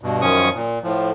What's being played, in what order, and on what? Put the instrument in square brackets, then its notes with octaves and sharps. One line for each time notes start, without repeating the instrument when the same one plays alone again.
[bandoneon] G2 B2
F#2 D#3 F3 C#4 C#6 D#6
A#2
A2 F3